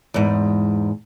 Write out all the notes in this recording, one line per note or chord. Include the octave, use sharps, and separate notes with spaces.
E2 G#2